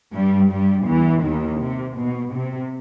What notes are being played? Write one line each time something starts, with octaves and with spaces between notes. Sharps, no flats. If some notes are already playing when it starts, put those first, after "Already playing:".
G2 G3
G2 G3
E2 E3
D#2 D#3
C3
B2
C3